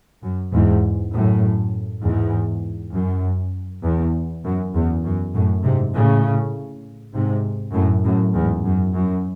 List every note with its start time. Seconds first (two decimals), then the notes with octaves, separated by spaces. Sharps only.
0.23 F#2
0.52 E2 G#2
1.12 F#2 A2
2.03 E2 G#2
2.93 F#2
3.83 E2
4.44 F#2
4.74 E2
5.04 F#2
5.34 F#2 A2
5.63 G#2 C3
5.94 A2 C#3
7.13 G#2 C3
7.74 F#2 A2
8.04 F#2 A2
8.34 E2 G#2
8.65 F#2
8.94 F#2